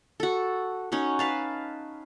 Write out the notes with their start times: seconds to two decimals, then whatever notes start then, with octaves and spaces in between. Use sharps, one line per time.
0.20 F#4 A4
0.92 C#4 D#4 F#4
1.19 B4 F5 A5